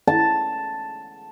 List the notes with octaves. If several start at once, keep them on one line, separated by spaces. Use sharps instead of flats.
A5